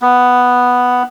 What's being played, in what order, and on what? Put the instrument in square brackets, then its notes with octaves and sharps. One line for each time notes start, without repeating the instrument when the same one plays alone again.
[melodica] B3